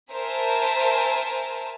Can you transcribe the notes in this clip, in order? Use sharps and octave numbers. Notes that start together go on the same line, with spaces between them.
A#4 C5 E5 G#5 A5